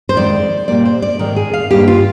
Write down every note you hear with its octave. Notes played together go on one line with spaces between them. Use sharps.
C5
F2 D#3 G#3 D5
A#2 G3 A#3 D5
C5
D5
G#2 D#3 G#3 A#4
G#4
F5
G2 D#3 A#3 G4
F4